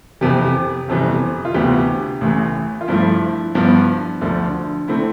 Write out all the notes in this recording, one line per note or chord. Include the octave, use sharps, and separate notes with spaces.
F2 C3 E3 G4
G1 F2 C3 E3
F4
D2 C3 E3 B3 G4
A1 A2 E3
F4
G2 F3 A3 E4
G2 F3 B3
D2 D3 F3
D3 A3 C4 E4